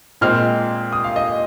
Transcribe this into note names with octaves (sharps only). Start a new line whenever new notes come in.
A#2 G#3 C4 F6
D#6
F5
D#5